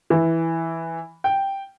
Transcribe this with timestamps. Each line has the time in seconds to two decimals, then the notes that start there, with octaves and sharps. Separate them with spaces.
0.10 E3
1.24 G5